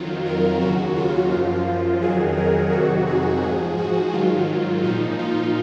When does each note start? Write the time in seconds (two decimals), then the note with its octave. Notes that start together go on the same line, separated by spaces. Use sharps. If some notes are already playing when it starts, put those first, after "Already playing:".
Already playing: F2 D#3 F#3 F4
0.26 A#4
0.61 D#2 C#3 F#3 F#4
0.97 F4
1.32 F#2 F3
2.02 F2 D#3 F#3 G#4
2.37 A#4
2.72 F2 C3 D#3 F#3 F#4
3.07 G#4
3.43 G#2 F3 G#4
3.78 F#4
4.13 G#2 D#3 F#3 F4
4.84 A#2 F3 D#4
5.19 F4